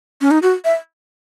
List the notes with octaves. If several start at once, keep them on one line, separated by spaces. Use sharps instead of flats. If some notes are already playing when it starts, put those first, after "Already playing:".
C#4
D#4
F#4
E5